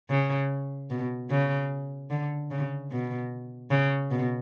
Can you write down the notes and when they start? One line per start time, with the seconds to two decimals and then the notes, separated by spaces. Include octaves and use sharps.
0.10 C#3
0.90 B2
1.30 C#3
2.10 D3
2.51 C#3
2.91 B2
3.71 C#3
4.11 B2